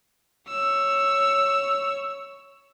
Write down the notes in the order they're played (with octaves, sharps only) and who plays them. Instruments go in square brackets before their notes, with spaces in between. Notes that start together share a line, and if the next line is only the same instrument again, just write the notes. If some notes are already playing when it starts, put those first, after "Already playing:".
[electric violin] C#5 E6